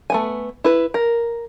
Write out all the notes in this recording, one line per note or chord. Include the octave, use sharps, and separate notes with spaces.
A3 B3 G#5
E4 B4
A#4